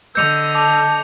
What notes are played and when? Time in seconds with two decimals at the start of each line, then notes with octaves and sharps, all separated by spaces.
0.15 D3 D#5 E6 G6 C#7 F7
0.55 A5 D6